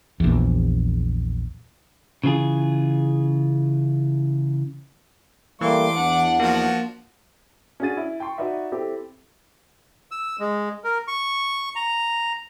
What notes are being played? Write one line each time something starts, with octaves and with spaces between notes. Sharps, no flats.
A#1 E2
C#3 E3 F4 G#4
E3 G3 A3 A#3 C6 D6
E2 D4 F#5
F3 A#3 F#4
C#4 D4 F#4 G#4 A6 D#7
E4
G5 C6 C#6
D#4 F#4 B4 D5 E5
C4 E4 G4 A4
E6
G#3
A#4
C#6
A#5